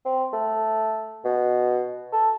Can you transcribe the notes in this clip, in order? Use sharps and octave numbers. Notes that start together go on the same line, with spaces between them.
C4
A3
B2
A4